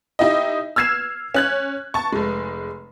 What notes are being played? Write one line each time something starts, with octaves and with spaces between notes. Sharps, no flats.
D#4 E4 G4 D#5
E6 F6 G#6 C7 E7
C#4 F#6 G#6
A5 C#6
F1 G#3